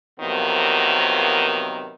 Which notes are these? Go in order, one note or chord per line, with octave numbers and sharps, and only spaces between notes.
C3 D#3 F3 F#3 A#3 B3